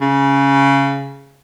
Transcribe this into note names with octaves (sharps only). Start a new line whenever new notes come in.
C#3